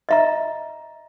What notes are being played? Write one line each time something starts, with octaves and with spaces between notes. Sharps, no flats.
D#5 E5 A#5